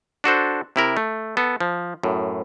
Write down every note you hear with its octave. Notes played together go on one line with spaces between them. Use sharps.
D4 F#4 A4 C5
C3 E4 A#4
A3
B3 A4
F3
F#2 A2